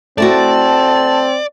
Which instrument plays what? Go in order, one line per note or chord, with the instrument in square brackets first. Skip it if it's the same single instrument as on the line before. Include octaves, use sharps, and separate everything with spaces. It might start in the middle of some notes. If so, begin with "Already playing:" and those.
[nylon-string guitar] A3 E4 F#4 [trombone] C4 [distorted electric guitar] D5 [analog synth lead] A5